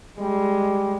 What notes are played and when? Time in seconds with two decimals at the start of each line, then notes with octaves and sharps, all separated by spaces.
0.19 G3 G#3